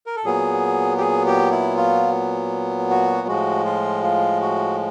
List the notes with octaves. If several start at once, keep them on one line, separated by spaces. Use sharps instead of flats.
A#4
A4
A#2 F#3 B3 G#4
G4
G#4
G4
E4
F4
F#4
A2 F3 G#3 F#4
F4
F4
F#4